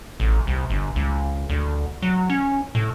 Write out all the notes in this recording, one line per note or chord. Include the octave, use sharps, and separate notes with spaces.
A1
C2
G1
C#2
D2
F#3
C#4
A2